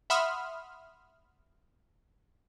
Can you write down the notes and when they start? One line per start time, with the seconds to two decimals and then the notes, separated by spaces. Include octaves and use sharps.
0.10 E5 F#5 B5 C6 D#6 F6